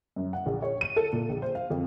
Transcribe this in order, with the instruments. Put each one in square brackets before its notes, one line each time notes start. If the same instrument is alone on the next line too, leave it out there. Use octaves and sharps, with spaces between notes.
[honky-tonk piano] F#2
F#5
A#1
C#5
D#7
A4
A#2
A#1
C5
F5
F2